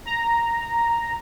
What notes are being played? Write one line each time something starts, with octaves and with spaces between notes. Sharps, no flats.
A#5